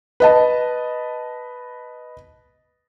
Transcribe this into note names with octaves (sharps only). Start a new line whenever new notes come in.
B4 D#5 A5